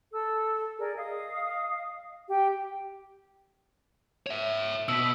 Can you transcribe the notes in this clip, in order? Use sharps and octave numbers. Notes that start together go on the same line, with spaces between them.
A4 E6
G#4 A#4 D5
D#5 F5 D#6
G4 G5
C#5 E5
B2 E6 B6